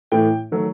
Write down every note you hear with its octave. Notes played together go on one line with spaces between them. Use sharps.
A2 E3 A3 G5
D#3 F#3 A3